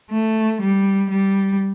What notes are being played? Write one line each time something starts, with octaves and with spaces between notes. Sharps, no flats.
A3
G3
G3